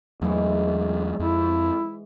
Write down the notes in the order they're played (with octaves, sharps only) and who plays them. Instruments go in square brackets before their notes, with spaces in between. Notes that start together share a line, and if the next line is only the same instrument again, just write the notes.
[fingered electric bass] E2 F#3 A3 [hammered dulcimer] G#2 E3
[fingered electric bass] F2 [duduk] E4